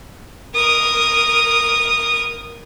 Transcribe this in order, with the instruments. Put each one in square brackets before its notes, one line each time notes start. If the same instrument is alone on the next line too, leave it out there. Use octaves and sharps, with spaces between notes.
[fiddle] A#4 D#6